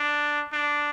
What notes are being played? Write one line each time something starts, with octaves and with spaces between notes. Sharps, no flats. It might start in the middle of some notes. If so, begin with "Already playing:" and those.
Already playing: D4
D4